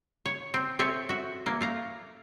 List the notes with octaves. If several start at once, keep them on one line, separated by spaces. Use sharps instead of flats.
C#5
C4
C4 A4 C#5 E5 G#5
F#4 E5
E3 A#3
A3 F5 A#5